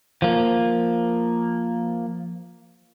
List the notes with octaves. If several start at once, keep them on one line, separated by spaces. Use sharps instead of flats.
F3 A#3